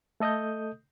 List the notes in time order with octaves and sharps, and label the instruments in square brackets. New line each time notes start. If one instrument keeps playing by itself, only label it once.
[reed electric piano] A3 A4 D#5 D#6 G6